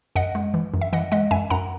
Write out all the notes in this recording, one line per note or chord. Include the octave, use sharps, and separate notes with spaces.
F#2 D#5 F#5
G#3
E3
F#2
E5
E3 D#5 F#5
G#3 D#5 F#5
F#2 E5 G#5
F#2 F#5 A#5